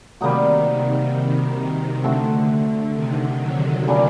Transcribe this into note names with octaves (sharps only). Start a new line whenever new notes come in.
C3 D#3 G3 A#3 D#4 F#4
D3 A3 C4 F#4
C3 D#3
D3 F#3
A#2 G3 D4